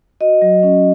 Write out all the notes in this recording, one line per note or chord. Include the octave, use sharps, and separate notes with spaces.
F#4 D#5
F#3
C#4